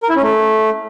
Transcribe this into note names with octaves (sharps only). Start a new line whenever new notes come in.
A#4
E4
C#4
A3